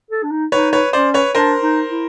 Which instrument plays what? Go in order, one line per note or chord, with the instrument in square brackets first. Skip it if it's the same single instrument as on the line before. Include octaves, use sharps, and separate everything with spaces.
[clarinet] A4
D4
D#4
[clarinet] D#4 [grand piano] B4 C#5
[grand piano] B4 C#5
[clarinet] C#4 [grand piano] C5 D5
[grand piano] B4 C#5
[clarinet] D4 [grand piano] A#4 C5
[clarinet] D#4
E4